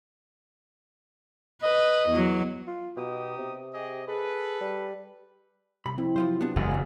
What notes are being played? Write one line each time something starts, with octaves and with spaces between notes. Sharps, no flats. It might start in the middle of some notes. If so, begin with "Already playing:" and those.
B4 D#5
E2 F#3
F4
B2 D#4 G4 D#6
C3
G4 G#4 D#5
G#4 A4 B4
G3
C2 C3 B5
F2 C4 E4
F3 F#3 F4 C5
B3 D4 G4
F#1 E2 E3 G#3 B3 G#5
A2 C#3